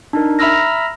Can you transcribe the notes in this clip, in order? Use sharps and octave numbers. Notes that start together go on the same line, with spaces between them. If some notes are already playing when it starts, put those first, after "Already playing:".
D4 D#4 A#4
E5 A#5 B5 E6 F6 A#6